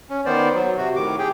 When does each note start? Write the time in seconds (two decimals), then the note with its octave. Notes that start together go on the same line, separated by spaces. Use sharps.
0.10 C#4
0.26 D#3 B3 C5 D5
0.54 F#3
0.77 C3 F#4
0.96 A2 D#3 D6
1.18 G4 G#4 G5